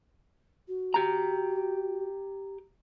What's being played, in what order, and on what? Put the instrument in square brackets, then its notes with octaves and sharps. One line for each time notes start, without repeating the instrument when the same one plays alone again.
[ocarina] F#4
[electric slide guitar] G4 A#5